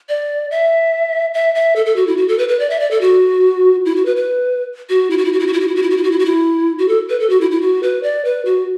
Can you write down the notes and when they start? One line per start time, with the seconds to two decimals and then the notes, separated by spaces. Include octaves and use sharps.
0.09 D5
0.51 E5
1.34 E5
1.55 E5
1.76 A4
1.86 A4
1.96 F#4
2.07 E4
2.17 F#4
2.28 A4
2.38 B4
2.49 B4
2.60 D5
2.70 E5
2.80 D5
2.91 A4
3.01 F#4
3.86 E4
3.96 F#4
4.06 B4
4.16 B4
4.89 F#4
5.11 E4
5.18 F#4
5.25 E4
5.33 F#4
5.40 E4
5.47 F#4
5.53 E4
5.60 F#4
5.68 E4
5.76 F#4
5.83 E4
5.90 F#4
5.97 E4
6.03 F#4
6.12 E4
6.19 F#4
6.25 E4
6.78 F#4
6.88 A4
7.10 B4
7.20 A4
7.30 F#4
7.41 E4
7.51 E4
7.61 F#4
7.83 B4
8.03 D5
8.25 B4
8.45 F#4